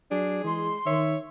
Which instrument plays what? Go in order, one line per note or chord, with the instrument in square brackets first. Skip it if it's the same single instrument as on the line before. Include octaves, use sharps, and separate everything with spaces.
[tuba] F#3 [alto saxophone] D4 [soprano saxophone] G#4
[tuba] E3 [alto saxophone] G#3 [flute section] C6
[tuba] D#3 [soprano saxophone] C#5 [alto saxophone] E5